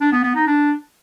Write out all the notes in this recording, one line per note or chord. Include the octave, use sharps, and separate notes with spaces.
D4
B3
B3
D#4
D4